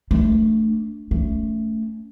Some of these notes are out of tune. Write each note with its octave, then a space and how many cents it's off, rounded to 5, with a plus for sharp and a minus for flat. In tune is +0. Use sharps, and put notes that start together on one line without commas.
A3 +0 D4 +0
A3 +0 C#4 +25